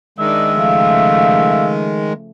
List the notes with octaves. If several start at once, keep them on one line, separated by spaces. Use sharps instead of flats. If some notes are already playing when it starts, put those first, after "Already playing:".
D#3 G#3 D4 D#4 E5
C#3 F3 A3 F5